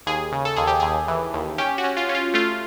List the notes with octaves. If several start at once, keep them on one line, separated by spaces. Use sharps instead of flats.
D#2 G#4
C#3
A4
D#2 G#4
G4
D#2 G#4
E3
D#2
C#4 G4
F#4
C#4
F4
C#4
F4
A3 F4